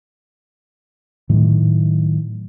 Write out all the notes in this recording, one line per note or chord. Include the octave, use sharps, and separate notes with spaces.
A2 D#3 F#3